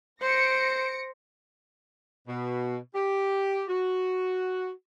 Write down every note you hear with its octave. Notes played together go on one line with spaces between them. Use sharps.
C5 A#6 C#7 D7
B2
G4
F#4